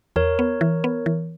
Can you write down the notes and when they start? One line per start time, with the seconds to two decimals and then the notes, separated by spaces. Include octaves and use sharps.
0.16 E2 A#4 C#5
0.39 B3
0.61 E3
0.84 B3
1.06 E3